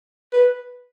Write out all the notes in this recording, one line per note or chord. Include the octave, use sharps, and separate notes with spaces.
B4